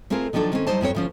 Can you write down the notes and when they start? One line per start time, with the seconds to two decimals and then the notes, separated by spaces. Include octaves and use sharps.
0.10 A3 C4 F4 G#4 A#4
0.33 D#3 F3 F#3 D4 A4
0.52 D#3 C4 C#4
0.67 F#3 G3 D#4 C5 A5
0.81 F2 F#3 C4 C#5
0.95 D2 F3 C#4